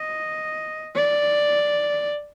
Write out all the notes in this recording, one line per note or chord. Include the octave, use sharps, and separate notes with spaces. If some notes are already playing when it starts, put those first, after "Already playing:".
Already playing: D#5
D5